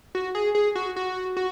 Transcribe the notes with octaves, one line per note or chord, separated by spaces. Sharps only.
F#4
G#4
G#4
F#4
F#4
F#4